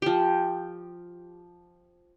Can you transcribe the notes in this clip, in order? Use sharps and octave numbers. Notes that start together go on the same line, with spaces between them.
F3 G4